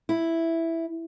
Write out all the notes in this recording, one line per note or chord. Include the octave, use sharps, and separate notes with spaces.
E4